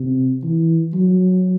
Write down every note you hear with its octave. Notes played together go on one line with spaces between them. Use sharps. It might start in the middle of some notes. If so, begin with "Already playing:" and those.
Already playing: C3
E3
F#3